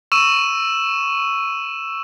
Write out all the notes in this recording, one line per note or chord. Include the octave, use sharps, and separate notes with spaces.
C#6 E6 D#7 E7